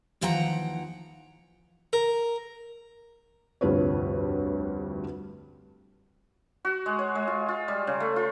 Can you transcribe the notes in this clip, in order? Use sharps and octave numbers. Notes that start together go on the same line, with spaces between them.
D#2 E3 F3 F#5 G5 A#5
A#4
F1 D2 G2 F4 B4 C#5
F#4
G#3
C#5
G#3
F4
F4
G3
C#3
A3
F4